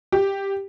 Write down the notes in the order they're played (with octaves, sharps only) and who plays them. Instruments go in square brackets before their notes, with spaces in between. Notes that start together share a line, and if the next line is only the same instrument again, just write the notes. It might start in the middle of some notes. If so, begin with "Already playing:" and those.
[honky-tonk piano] G4